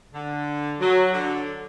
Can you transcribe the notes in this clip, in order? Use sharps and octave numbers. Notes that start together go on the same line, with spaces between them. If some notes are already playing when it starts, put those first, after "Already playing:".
D3
F#3
D3